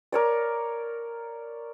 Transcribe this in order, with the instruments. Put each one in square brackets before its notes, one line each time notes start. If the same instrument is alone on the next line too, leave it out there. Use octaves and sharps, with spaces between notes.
[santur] A#4 C#5 D5